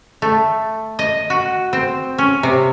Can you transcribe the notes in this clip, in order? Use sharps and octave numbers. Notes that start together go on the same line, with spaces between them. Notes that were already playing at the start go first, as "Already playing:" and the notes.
A3
D#5
F#4
C4
C#4
C3